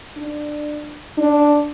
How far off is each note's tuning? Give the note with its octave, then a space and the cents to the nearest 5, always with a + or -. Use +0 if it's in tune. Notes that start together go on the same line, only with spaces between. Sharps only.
D4 +20
D4 +0